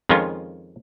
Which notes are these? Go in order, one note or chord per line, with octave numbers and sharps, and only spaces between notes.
F2 D#3 G#3 C#4 F4